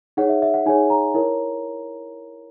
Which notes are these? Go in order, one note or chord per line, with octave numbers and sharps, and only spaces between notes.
D#4 G#4 C#5 F#5
E5
E5
F#5
D#4 G#4 C#5 G#5
A#5
E4 A#4 C#5